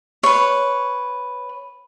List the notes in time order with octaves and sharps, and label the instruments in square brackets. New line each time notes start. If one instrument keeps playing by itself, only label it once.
[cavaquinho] B4 C#5